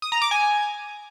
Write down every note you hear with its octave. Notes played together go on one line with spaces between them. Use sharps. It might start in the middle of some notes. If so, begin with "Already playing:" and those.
D#6
A#5
D6
G#5